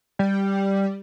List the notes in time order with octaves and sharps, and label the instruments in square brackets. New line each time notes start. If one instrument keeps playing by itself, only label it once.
[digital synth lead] G3